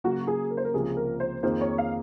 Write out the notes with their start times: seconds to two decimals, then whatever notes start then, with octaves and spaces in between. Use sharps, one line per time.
0.04 C#3 F#3 A#3 F#4
0.27 G#4
0.51 A#4
0.57 C5
0.65 A#4
0.74 C#2 C3 F3 A#3 G#4
0.97 A#4
1.20 C5
1.43 F2 D#3 A#3 F4 G#4 C5
1.61 C#5
1.78 F5